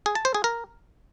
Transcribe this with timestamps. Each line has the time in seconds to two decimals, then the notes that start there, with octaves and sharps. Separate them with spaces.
0.06 G#4
0.15 A5
0.25 C5
0.34 G#4
0.44 A#4